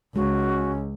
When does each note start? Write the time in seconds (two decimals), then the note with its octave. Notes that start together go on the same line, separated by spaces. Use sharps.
0.16 C#2 G#3 C#4 F#4